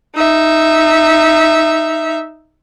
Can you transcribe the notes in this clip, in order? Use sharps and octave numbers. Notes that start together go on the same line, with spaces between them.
D#4 E5